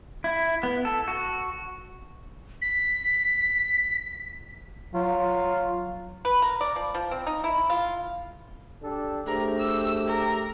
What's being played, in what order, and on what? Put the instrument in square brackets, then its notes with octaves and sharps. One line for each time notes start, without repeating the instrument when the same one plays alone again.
[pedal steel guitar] E4
B3
A4
F#4
[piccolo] B6
[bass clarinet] F#3 [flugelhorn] F4
[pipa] B4
A#4
D5
F3
F3
C4
D#4
E4
F4
[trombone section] D4 G4 A4
[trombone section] A3 G4 [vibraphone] D4 G#4 C5 [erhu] A#4
[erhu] E6
A#4